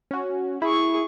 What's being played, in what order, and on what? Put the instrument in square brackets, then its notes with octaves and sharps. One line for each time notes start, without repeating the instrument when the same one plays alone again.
[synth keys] C#4 F#4
[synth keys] E4 [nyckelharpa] G#4 C#6